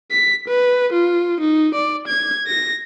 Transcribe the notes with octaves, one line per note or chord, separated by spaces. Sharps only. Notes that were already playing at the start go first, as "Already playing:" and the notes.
B6
B4
F4
D#4
D5
G#6
A#6